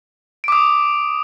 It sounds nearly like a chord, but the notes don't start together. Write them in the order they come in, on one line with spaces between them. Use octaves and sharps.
D7 D6 D#6